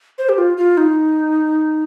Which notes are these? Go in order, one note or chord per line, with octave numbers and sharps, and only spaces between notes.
C5
G4
F4
F4
D#4